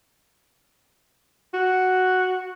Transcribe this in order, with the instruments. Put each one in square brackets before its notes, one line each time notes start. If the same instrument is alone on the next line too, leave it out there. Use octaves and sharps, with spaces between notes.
[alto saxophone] F#4